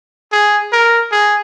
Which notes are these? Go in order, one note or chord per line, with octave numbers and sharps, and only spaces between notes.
G#4
A#4
G#4